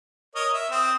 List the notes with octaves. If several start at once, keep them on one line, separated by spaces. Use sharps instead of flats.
A#4 C#5 D#5
E5
C4 D#6